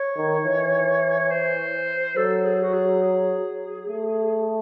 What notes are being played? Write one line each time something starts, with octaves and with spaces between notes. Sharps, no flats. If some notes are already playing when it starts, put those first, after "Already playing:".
Already playing: C#5
D#3
E3
C#5
C5
F#3 A4
G#4
F#4
G#4
G#4
A3